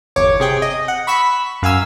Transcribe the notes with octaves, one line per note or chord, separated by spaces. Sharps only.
G1 E2 C#5 D6
C3 G#4 G5
D#5
F#5
B5 C#6 E6 B6
F#2 F5 G#5 E6